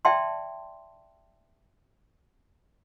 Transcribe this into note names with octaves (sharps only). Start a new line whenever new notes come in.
D5 E5 G5 A5 C6